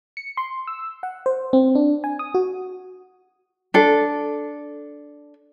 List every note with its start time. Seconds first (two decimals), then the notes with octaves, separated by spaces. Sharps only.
0.17 C#7
0.37 C6
0.67 E6
1.03 F#5
1.26 C5
1.53 C4
1.75 D4
2.04 G#5
2.19 D#6
2.34 F#4
3.74 D4 A4